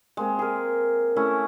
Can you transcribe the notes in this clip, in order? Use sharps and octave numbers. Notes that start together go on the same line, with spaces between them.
G#3 A#3 C4
G#4 A#4
A3 C#4 E4